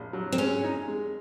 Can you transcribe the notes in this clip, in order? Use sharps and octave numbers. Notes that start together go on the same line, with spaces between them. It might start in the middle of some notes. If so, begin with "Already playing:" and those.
Already playing: A#1
F#3
C4
G#3 C#4
D#4
G#3